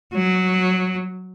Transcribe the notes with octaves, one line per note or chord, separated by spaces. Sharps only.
F#3